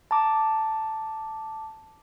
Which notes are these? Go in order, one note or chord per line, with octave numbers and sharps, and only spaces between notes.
A5 A#5 D6